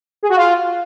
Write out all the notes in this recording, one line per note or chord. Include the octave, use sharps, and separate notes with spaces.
G#4
F#4
F4